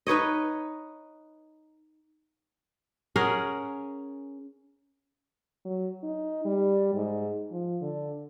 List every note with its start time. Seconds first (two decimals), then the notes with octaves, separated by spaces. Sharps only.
0.07 D#4 B4 C#5 D#5
3.16 C#4 G#4 A#4 F#5
5.65 F#3
6.03 D#4
6.45 G3
6.95 G#2
7.51 F3
7.81 D3